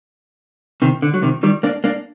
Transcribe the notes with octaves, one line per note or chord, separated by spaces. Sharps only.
C3 D#3
D3
F#3
C3 D#3
D#3 G3
A#3 D4
A#3 D4